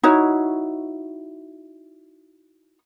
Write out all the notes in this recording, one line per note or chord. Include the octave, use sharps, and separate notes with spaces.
D#4 E4 F#4 C#5